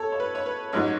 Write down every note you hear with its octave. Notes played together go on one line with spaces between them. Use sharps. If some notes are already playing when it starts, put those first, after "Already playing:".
Already playing: A4 C#5
C#5
B4
C#5
B4
A1 G#2 F#3 C#5